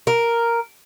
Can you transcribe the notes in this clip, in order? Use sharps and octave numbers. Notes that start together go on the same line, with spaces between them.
A#4